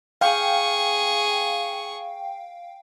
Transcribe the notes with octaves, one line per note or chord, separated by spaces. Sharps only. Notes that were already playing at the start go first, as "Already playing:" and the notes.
G#4 F5 G5 C#6